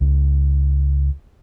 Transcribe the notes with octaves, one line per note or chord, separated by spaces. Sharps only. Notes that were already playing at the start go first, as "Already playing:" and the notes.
C#2